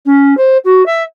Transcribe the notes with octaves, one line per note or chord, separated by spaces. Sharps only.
C#4
C5
F#4
E5